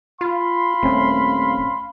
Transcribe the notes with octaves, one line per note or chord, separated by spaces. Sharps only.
F4 F5 B5 C6
D#1 A3 C4 C#4